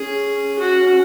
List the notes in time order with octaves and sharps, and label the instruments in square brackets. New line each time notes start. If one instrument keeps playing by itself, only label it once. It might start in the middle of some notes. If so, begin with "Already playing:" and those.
Already playing: [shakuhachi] C#4 [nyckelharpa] G#4
[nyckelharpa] F#4